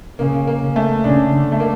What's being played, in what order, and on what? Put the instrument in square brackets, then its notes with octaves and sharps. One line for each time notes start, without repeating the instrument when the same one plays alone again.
[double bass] C#3 [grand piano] A#3
[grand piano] A#3
[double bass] C#3
[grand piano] A3
[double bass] C#3 [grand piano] D4
[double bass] D3
[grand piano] A3
A#3